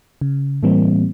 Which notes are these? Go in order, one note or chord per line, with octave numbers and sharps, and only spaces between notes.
C#3
A2 E3 G3 A#3 C4